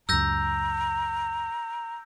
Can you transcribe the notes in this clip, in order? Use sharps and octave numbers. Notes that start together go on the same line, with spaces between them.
C#2 F#2 A#5 E6 G6 A#6